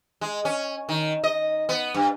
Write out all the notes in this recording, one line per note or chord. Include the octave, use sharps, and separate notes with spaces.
G#3
C#4
D#3
D#5
B3
G2